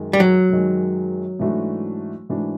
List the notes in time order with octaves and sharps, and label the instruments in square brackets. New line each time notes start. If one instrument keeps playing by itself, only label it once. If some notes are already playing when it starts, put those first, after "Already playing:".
Already playing: [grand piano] F#2 D#3 G#3
[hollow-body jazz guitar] G3
F#3
[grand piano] F#2 D#3 G#3
G#2 E3 A3 D4 F#4
G#2 E3 A3 D4 F#4